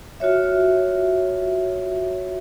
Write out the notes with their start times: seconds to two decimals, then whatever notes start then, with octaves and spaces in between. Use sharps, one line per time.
0.20 F4 F#4 C#5 E5